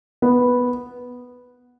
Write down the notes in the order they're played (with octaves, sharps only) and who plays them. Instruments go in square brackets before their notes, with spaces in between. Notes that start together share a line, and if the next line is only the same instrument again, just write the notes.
[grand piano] B3